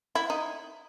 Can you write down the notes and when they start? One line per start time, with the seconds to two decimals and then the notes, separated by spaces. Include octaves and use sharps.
0.15 E4
0.30 D#4